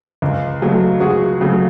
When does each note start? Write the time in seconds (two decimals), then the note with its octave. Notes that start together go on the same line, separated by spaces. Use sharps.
0.22 C#2
0.62 C#3 F#3 A3
1.00 C#2 F#4 G#4
1.41 C#3 F#3 A3